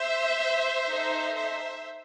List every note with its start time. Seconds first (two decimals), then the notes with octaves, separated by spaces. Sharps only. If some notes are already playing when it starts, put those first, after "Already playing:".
Already playing: C5 E5
0.89 D#4 A4
1.35 C5 E5